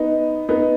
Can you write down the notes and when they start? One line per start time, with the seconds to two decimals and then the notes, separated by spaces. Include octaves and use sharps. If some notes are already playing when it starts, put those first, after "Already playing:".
Already playing: B3 D#4
0.49 B3 D#4